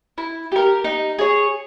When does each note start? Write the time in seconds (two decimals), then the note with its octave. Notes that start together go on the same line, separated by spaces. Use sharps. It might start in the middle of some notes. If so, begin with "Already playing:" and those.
0.18 E4
0.52 G4 A#4
0.84 D#4
1.19 G#4 C#5